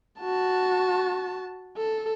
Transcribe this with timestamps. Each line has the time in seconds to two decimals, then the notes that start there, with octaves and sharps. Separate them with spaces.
0.21 F#4 A5
1.77 A4